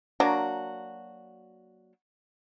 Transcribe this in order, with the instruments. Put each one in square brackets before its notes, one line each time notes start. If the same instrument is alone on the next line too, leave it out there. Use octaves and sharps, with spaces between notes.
[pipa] F#3 A#3 D4 F#4